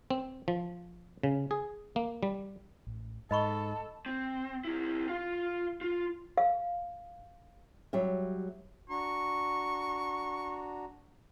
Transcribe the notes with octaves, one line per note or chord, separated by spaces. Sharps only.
C4
F3
C#3
G#4
A#3
G3
A1
G#2 A4 D#5 B5 C#6
C4
C4 E4
F4 F5
F4
F5
F#3 G3 G4 E5
D4 F#4 A#5 C#6